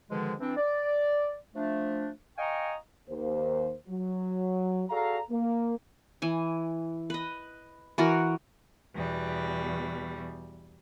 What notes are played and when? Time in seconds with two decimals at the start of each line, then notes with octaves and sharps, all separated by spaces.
0.10 G#2 B2 D3 D#3 F3 G#3
0.41 E3 C4 D4
0.57 D5
1.55 F3 A3 D4
2.38 D#5 F5 G5 G#5 A#5 C#6
3.09 D#2 A#3 C5
3.88 F#3
4.90 F#4 G#4 A4 D5 F5 A#5
5.30 A#3
6.22 E3 G#5
7.10 B4 D#5
7.98 E3 F#4 A#4
8.94 E2 B2 G3